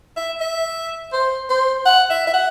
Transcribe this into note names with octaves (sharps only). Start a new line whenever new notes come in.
E5
E5
C5
C5
F#5
E5
E5
F#5